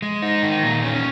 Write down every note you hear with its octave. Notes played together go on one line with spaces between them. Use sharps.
G#3
D#4
D#3
A#2
C#4